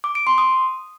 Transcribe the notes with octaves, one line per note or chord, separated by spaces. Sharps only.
D6
D7
C6
D#6